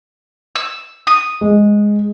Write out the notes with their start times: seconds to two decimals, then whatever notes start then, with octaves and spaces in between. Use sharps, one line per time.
0.56 E6
1.07 D#6
1.41 G#3